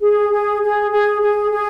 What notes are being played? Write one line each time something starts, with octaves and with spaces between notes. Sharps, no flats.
G#4
G#4
G#4
G#4
G#4
G#4